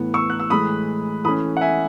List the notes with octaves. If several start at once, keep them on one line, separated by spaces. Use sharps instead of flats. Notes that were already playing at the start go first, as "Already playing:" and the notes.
Already playing: A2 E3 B3
C#6 E6
F#6
E6
A2 E3 G#3 B5 D#6
E3 A3 C#4 B5 D#6
F#5
E5 G#5